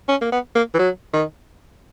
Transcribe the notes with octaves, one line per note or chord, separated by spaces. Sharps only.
C#4
A#3
B3
A#3
E3
F#3
D#3